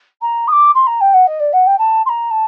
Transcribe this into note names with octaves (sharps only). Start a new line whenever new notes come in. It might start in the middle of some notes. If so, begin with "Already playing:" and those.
A#5
D#6
D6
C6
A#5
G5
F#5
D#5
D5
F#5
G5
A5
C6
A#5
A5